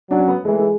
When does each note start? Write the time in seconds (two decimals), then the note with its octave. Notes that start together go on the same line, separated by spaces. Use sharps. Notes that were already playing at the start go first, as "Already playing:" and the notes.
0.10 F#3 D4
0.18 C#4
0.28 B3
0.45 E3 G#3
0.52 A3
0.59 G#3